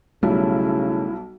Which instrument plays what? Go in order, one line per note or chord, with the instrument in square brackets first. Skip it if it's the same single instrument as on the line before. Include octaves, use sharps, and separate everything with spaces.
[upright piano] B1 F#3 G3 [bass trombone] C#3 [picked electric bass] A3 [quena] E4